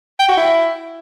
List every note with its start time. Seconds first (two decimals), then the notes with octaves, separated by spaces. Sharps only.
0.20 G5
0.28 F#4
0.37 E4